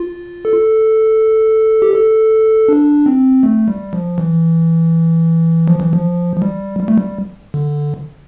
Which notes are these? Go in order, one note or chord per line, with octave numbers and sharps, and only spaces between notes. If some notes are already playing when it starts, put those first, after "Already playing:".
Already playing: F4
A4
G4
A4
D4
C4
A3
G3
F3
E3
F3
E3
F3
F3
G3
G3
A3
G3
D3